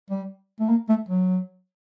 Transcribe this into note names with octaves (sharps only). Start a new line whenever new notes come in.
G3
A3
A#3
A3
F#3